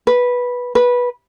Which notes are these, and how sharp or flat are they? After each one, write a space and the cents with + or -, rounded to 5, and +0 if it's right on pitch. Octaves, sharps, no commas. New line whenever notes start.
B4 -10
B4 -15